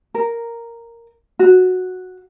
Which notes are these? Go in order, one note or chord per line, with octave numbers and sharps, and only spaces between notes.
A#4
F#4